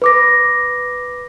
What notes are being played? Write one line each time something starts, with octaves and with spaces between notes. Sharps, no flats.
B4 D6 A#6